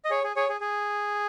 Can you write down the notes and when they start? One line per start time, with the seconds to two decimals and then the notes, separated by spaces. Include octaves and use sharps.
0.05 D#5
0.10 G#4 C#5
0.24 G#4
0.36 G#4 C#5
0.49 G#4
0.61 G#4